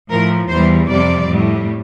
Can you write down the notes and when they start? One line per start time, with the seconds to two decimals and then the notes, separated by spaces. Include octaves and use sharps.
0.11 A2 F3 A#4
0.49 E2 E3 G3 C5
0.89 F2 C3 G3 D5
1.28 A2 G3